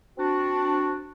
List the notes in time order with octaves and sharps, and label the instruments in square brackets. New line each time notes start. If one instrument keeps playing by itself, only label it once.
[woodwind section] C4 D4 F#4